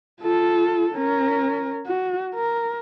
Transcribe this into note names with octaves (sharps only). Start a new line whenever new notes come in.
F4 A4
C#4 A#4
F#4
A#4